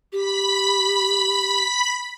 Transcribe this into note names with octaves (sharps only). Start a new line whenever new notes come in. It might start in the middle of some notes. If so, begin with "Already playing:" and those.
G4 B5 B6